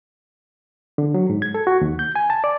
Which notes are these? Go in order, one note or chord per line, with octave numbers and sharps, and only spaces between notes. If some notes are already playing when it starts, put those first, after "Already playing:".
D3
F#3
G#2
G#6
A4
F#4
D#2
G6
G#5
A5
D5